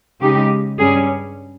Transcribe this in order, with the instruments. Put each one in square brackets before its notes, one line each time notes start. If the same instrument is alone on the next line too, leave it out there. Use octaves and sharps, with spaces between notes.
[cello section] C#3 G#3 D#4 G4
G2 G3 C#4 G#4